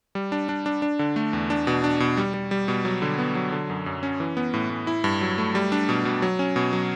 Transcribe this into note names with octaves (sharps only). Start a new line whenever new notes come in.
G3
D4
D4
D4
D4
D3
A3
E2
D4
B2
D4
B2
G3
G3
G3
B2
F#3
D3
B3
F#3
D3
F#2
F#2
C#4
E3
B3
A2
A2
E4
G2
F#3
A3
G3
D4
B2
B2
F#3
C#4
B2
F#3